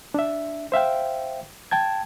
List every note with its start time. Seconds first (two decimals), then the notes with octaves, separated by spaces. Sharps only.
0.14 D4 E5
0.72 C5 E5 F5 G5
1.71 G5 A5 G#6